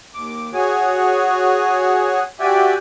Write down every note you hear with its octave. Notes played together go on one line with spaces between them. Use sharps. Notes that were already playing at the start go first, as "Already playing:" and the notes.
D#2 D6
F#4 G#4 C#5 G#5
F#4 G4 D5 E5 G5 G#5